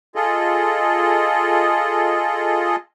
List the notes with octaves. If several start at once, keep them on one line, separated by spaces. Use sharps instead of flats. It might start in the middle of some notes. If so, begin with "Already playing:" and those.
F4 G#4 A4 D#5